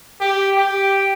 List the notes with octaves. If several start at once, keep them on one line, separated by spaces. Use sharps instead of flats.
G4
G4